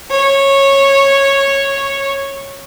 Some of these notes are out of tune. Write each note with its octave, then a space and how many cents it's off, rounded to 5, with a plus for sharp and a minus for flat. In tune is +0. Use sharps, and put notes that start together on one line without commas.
C#5 -10